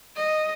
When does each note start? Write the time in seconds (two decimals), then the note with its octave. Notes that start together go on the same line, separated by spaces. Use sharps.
0.16 D#5